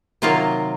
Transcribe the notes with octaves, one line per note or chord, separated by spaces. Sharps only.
C3 D#3 F#3 A#3 F4